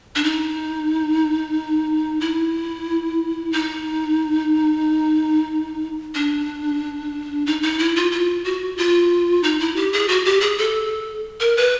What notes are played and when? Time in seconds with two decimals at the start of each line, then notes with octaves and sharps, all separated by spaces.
0.15 D4
0.24 D#4
2.21 E4
3.53 D#4
6.15 D4
7.46 D#4
7.63 D#4
7.79 E4
7.96 F4
8.12 F4
8.45 F#4
8.78 F4
9.43 D#4
9.60 E4
9.76 G4
9.93 G#4
10.08 F#4
10.25 G4
10.41 G#4
10.58 A4
11.40 A#4
11.57 B4